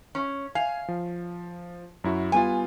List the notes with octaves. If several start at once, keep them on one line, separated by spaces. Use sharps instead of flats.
C#4
F5 G#5
F3
F#2 E4 F#4
G3 B3 F4 G#5